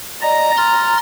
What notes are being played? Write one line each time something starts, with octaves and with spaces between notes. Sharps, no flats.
D5 D#5 A#5
C6 F6 A6